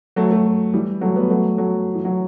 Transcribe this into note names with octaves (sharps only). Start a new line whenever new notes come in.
F#3 A3
F#3 A3
E3 G3
F#3 A3
G3 B3
F#3 A3
F#3 A3
E3
F#3